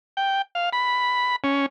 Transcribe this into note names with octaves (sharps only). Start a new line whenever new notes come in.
G5
F5
B5
C#4